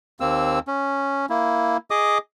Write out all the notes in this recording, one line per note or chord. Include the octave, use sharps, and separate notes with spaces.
D#2 A#3 C4 E6
C#4
A#3 E4
G#4 D#5 D6 D#6